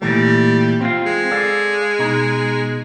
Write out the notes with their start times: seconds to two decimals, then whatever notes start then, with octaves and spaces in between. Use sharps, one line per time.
0.02 A#2 E3 G3 A3
0.81 C4 F4 F5
1.06 G#3
1.31 A4 D5 F5
1.99 B2 D#4